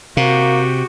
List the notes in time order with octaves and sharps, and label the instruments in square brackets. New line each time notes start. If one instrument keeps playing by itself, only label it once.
[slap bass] C3 [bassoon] A#3 [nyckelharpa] F#4 G4